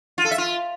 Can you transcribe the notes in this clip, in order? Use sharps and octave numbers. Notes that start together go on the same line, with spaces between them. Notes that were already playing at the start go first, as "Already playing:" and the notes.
F4
A4
E5
F4